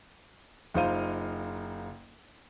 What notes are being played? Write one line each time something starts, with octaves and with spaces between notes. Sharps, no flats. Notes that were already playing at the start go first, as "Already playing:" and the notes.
F#1 D#4 F4 C5 F5 D#7